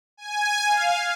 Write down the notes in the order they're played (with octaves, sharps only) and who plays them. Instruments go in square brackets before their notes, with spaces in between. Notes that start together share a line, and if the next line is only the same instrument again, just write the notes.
[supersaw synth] G#5
F5